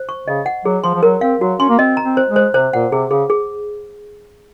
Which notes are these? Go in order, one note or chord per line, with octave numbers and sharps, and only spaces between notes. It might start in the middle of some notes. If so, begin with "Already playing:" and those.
Already playing: C5
C#6
C#3 D#5
F#5
F#3 G#4
F3 C6
F3
F#3 A#4
C4 F5
F#3 F#4
C#4 C6
A#3
C4 D#5
A#5
C4
C5
G#3
C5
C3 C5
A#2 F#5
C3 G#4
C#3 G#4
G#4